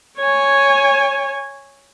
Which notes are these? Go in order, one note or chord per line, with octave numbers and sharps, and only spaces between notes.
C#5 G#5